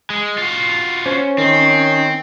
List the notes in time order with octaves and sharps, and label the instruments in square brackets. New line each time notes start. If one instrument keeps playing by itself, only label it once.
[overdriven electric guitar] G#3
F4 F#4
[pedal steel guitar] C#4 [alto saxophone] C5
[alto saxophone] D#3 [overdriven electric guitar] C4